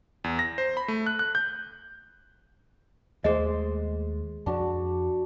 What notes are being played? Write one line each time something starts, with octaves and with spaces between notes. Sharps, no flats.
E2
A#6
C5
B5
A3
F#6
F#6
G6
D#2 G#3 A3 G#4 C5 D#5
F2 D4 F#4 D5